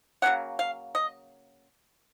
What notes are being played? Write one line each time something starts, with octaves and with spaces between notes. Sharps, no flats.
C#3 F#3 A#3 C#4 F#5
F5
D#5